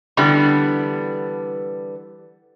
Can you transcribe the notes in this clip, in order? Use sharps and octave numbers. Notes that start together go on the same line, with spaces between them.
D3 E3 G3 B3